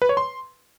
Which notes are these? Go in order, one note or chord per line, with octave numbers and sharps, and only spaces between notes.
B4
C#5
C6